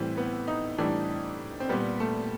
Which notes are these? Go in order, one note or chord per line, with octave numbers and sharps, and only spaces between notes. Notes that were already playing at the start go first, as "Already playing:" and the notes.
Already playing: A2 E3 G3 C4
B3
D#4
A2 E3 G3 D4
C4
A#2 G3 B3
A3